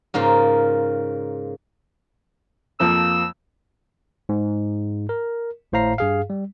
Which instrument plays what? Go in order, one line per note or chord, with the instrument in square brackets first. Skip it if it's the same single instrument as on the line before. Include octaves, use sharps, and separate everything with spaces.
[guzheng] G#2 C#3 A#3 F4
[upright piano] F2 F3 A#3 [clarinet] E6
[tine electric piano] G#2
A#4
G#1 A2 C5 F5 A#5 C7
G2 G#4 F5
G3